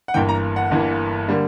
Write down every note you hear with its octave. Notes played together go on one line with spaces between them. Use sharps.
F#5
G1 G2 E3 A#3 G5
A#5
F#5
G1 G2 E3 A#3
D3 G3 A#3